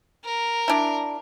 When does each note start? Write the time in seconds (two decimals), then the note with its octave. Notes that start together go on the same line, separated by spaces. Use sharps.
0.24 A#4
0.68 D4 E4